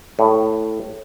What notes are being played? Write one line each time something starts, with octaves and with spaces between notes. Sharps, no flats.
A2